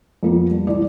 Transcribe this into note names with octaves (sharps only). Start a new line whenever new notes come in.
F2 A#3 B3
G3
C2 E3 D5